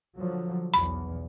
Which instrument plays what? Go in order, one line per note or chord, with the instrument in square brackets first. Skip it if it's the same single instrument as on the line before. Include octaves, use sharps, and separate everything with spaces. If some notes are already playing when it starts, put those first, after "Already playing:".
[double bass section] D3 F3 F#3
[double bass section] B1 E2 [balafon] B5